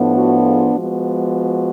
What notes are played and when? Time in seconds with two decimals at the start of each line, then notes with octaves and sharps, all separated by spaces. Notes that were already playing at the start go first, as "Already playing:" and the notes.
Already playing: A2 F3 B3 D4
0.14 F#4 A4
0.43 F4 G#4
0.74 F3 G#3 B3 F#4